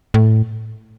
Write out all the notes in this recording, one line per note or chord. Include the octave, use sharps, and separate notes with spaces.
A2